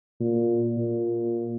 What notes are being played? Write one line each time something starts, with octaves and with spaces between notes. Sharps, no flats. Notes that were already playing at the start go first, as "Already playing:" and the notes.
A#2
A#2